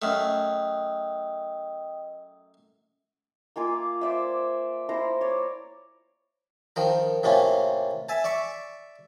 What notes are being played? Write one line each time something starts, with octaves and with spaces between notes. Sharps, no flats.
F#2 A3 D#5 G5 D#6
A#3 F4 G#5 D6
C5 D5 E5
E4 C5 A#5
C#5 D5
D#3 F3 A#4
A2 C3 A#3 C#4 F4
E5 G#5 A5
D5 E5 C#6